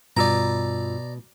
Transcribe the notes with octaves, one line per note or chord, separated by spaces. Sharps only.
G2 B2 F4 D5 A#5 E6